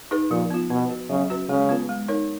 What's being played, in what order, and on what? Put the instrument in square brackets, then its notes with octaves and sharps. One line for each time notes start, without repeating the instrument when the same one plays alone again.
[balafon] D#4 G#4 B4
[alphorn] A#2 [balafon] F3
[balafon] B3 F4
[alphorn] B2 [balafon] B3
[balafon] F#4 B4
[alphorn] C#3 [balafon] F#3
[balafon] C#4 F#4 B4
[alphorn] C#3 [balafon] G#3
[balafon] B3 F4 B4
G#3
D#4 A#4 C#5